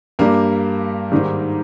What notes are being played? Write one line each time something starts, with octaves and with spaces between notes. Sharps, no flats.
G2 G3 A#3
G#2 D#3 G3